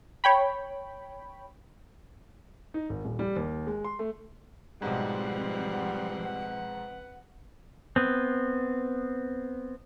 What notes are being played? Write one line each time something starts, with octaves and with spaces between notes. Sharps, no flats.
C#5 G5 B5
D#4
G#1
D#1
G3
D#2
G#3
C6
A3
B1 G#2 F3 G3 C4 B4 F#5
B3 C4